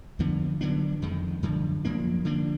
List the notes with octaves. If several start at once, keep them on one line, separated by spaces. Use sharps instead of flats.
F2 D3 F3 B3
D3 F#3 B3 D4
F2 D#3 G#3
F#2 D3 F3
F#2 F3 A#3 D4
D3 F3 A#3 D4